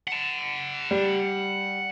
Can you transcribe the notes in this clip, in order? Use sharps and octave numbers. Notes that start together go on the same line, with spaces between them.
F#5 A5
G3